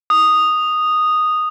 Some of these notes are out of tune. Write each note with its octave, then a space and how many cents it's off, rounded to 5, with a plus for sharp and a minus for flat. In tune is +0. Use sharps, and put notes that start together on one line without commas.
D#6 -5